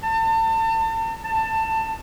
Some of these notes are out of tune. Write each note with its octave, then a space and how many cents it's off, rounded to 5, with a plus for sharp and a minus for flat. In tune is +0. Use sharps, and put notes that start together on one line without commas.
A5 +35
A5 +20